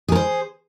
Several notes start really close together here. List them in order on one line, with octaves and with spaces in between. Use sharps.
G#4 A#4 C5